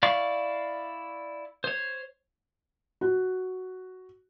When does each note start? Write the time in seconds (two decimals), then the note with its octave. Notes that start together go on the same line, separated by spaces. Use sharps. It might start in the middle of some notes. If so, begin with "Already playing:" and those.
0.03 E4 D5 F5 C#6
1.64 C5 C#5
3.01 F#4